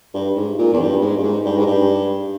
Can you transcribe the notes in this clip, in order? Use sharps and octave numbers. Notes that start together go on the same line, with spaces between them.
G2
G#2
A#2
E2
G2
G#2
G2
G#2
G2
G#2
G2